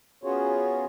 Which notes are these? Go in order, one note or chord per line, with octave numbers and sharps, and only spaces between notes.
B3 C#4 F4 F#4 G#4 C#5